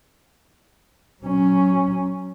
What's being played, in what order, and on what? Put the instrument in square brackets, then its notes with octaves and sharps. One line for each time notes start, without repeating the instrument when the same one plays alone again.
[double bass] F#3 C#4